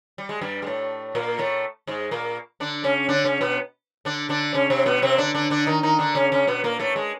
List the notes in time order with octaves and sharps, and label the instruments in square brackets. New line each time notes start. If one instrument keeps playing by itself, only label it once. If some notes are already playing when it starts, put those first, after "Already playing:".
[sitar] G3
G#3
G2 G3
G#3
A2 A3
A#2 A#3
A2 A3
G#2 G#3
A#2 A#3
D3 D4
C#3 C#4
D3 D4
C#3 C#4
B2 B3
D3 D4
D3 D4
C#3 C#4
C3 C4
B2 B3
C3 C4
D3 D4
D3 D4
D3 D4
D#3 D#4
D#3 D#4
D3 D4
C#3 C#4
C#3 C#4
B2 B3
A#2 A#3
A2 A3
G#3